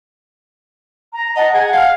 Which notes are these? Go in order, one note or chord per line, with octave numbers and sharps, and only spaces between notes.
A#5
D#5 F#5 A5 A#5
G#4 F#5 G#6
F5 F6